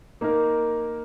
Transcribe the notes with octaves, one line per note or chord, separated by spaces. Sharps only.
A#3 D#4 A#4